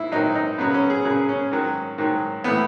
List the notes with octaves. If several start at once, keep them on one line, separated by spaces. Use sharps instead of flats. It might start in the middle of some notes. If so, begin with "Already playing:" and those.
Already playing: G#2 E4
G#2 D#3 F#3 D#4
D#4
F#2 C#3 F#3 B3
C#4
G#4
F#2 C#3 F#3 G#4
C#4
G#2 D#3 F#3
G#2 D#3 F#3
A2 E3 B3